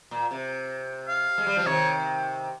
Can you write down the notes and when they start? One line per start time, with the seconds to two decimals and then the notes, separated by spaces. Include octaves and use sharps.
0.11 A#2
0.31 C3
1.08 F5
1.38 G#3
1.47 G3
1.57 F3
1.66 C3 D#3 C#5